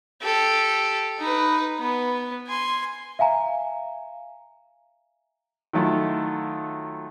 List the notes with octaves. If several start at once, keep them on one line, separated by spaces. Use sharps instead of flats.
G4 A4
D#4 B4
B3
G#5 C6
E5 F5 G#5 A#5
D#3 F#3 A3 E4 F4